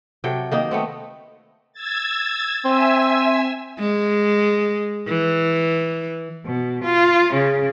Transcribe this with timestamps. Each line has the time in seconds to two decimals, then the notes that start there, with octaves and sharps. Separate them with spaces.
0.24 C3 F#3 A4 G5
0.52 D#3 A#3 D#4
0.71 A3 B3 C4
1.73 E6 G#6 A6
2.65 C4 E5 G#5 E6
3.79 G#3
5.08 E3
6.45 B2
6.83 F4
7.33 C#3